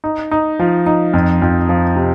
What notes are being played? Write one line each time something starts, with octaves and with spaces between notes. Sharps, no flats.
D#4
D#4
F3
D#4
F2
F2
F3
C3